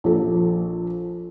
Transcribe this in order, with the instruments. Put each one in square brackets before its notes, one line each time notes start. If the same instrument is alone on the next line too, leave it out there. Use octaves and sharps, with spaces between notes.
[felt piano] A#1 A4